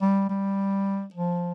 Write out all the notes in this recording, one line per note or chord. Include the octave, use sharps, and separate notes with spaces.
G3
G3
F3